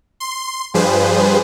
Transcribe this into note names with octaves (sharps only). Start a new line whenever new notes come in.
C6
G2 F3 G3 G#4 B4 C5